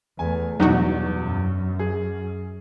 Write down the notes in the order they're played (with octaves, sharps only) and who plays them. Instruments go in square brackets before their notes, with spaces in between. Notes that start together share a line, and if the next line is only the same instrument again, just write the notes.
[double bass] E2 A3 [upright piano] G#5
[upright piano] E2 G2 [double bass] B2 [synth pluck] F#3 D#4 F#4
[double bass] F#2
[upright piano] G#4